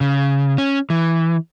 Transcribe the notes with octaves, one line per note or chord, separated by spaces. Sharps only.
C#3
C#4
E3